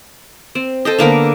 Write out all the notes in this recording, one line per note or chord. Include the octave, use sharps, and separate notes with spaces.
C4
A4 C5 D#5
D3 A#3 B3 A#4